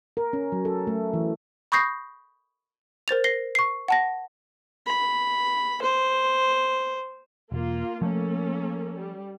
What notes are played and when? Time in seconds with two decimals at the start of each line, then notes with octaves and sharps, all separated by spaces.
0.17 A#4
0.33 C#4
0.52 F#3
0.65 A4
0.87 A3
1.13 E3
1.72 B5 C#6 D#6 G6 A#6 C7
3.08 A#4 C5 A6 F7
3.24 A#6 C7 G7
3.55 C#6 C7
3.88 F#5 A5 A#6
4.86 B5
5.82 C5
7.52 E1 A#3 F4
8.02 F3 A3 A#3 C#4 A4
8.97 G3